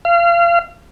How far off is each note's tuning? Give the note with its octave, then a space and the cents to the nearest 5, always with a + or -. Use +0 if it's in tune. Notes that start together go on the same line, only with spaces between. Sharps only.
F5 -30